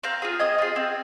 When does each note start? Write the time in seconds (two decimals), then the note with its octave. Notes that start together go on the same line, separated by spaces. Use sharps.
0.03 C4 F5 A#5
0.22 F4 G#4
0.40 C4 D#5 G#5
0.58 F4 G#4
0.76 C4